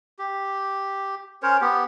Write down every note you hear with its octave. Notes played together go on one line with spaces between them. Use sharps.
G4
C#4 A#4 C5 C#5
B3 G4